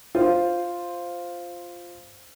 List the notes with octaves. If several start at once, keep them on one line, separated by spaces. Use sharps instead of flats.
F4 C5